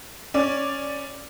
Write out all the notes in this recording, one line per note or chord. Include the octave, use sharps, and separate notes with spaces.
C#4 D5